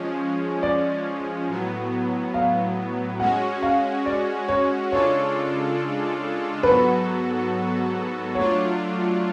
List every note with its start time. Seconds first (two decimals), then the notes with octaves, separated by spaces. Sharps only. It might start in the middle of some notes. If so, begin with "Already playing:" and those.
Already playing: F3 G#3 C#4
0.63 D5
1.48 A2 F#3 B3
2.34 F5
3.20 G#3 C#4 F#4 F#5
3.62 F5
4.06 D5
4.48 C#5
4.92 C#3 G#3 D4 F4 A4 C#5
6.63 G#2 F#3 B3 F#4 A4 B4
8.35 F#3 A3 D4 F4 C#5